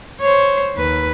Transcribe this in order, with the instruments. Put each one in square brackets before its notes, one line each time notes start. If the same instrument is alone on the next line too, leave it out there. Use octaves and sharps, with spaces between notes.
[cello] C5 C#5
D#2 B4